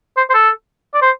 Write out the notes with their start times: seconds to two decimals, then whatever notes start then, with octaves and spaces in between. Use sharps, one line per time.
0.17 C5
0.30 C5
0.34 A4
0.94 D5
1.02 C5